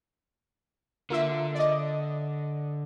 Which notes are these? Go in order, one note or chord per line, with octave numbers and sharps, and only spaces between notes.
D3 A#3 F4 E5
D5 D#5